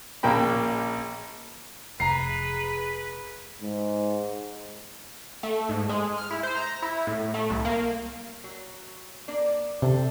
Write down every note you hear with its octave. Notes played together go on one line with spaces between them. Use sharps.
A#1 A#2 C#3 A#3 G5 B5
F1 G#3 B4 A#5 C7
G#2
A3
G#2
G#3
F6
E4
C5
A#5
E4
A2
A3
C2
A#3
F#3
A#3 D4 D5
C3 A4 B4 C5